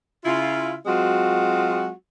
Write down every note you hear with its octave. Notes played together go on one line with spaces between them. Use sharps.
C#3 E4 F4
F#3 G#3 C4 F4 F#4